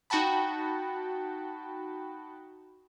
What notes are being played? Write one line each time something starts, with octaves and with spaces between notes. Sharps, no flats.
D#4 F#4 G5 A5 B5